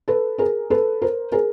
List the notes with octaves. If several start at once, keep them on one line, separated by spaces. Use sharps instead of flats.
A4 B4
G#4 A#4
A4 B4
A#4 C5
G#4 A#4